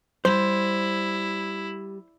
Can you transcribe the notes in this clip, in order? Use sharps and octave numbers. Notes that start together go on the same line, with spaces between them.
G3 E4 C5